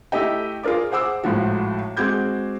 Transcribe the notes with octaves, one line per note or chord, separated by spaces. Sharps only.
A3 E4 G4 D#5 G5
F4 G#4 A#4 D5 D6
G#4 C5 F#5 D6 E6
G#1 A2 F3 F#4
G#3 C4 F#4 D6 G6 G#6